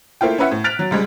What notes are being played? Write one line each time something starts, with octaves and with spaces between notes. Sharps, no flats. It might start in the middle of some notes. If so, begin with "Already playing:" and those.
A3 A#3 E4 F4 G5
C#4 E4 B4 E5 F#5
A2
F6 F#6 A6 B6 D7 F7
F#3
C#2 G3 G#3